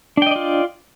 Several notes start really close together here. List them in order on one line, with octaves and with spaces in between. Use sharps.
D4 G5 D#5 D5 F4